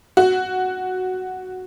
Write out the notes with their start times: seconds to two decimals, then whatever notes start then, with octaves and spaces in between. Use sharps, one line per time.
0.17 F#4